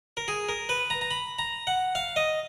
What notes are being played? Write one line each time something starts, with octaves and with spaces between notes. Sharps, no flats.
A#4
G#4
A#4
B4
A#5
A#5
B5
A#5
F#5
F5
D#5